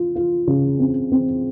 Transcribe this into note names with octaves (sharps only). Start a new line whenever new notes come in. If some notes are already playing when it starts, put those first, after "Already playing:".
Already playing: F4
F4
C#3
C4
C4